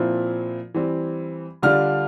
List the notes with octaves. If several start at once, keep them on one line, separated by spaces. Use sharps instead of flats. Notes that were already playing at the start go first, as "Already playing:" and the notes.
Already playing: A#2 F3 C4 E4
E3 G3 C4
D3 G3 D4 F4 F6